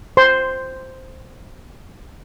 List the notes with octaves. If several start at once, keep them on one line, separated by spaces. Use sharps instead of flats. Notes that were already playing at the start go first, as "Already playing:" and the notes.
C5 C6